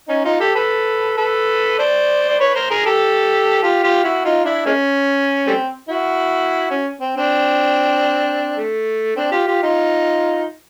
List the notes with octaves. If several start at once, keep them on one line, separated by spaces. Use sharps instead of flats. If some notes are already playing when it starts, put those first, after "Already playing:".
C#4 D#4
D#4 F4
G4 A4
A4 B4
A4 B4
C5 D5
D5
B4 C#5
A#4 C5
G#4 A#4
G4 A4
F4 G4
F4 G4
E4 F#4
D#4 F4
D4 E4
G#3 A#3 C#4
G3 A3 C4
E4 F#4
C#4
C4
C4 D4
A3
C4 D4
F4 G4
F4 G4
D#4 F4